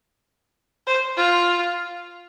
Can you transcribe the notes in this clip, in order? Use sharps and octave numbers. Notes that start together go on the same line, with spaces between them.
C5
F4